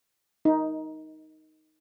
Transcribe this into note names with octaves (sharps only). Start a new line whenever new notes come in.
D#4